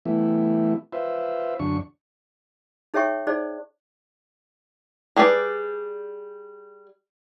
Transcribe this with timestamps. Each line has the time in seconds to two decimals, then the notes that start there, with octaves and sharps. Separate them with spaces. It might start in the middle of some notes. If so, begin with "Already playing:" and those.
0.05 E3 G3 A3 B3 E4
0.93 F4 B4 C5 E5
1.59 F#2 D3 D4 C#6
2.94 D#4 G#4 C#5 E5 G5 C#6
3.27 D#4 G#4 C5 D5
5.16 G3 G#4 B4 D5